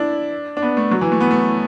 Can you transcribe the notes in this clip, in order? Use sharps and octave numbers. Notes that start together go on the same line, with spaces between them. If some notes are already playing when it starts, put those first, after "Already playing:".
Already playing: D4 E4
D4
B3
A3
F#3
E3
A3
B3
A3